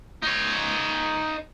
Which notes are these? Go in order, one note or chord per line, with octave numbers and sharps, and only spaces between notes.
D#4 C#5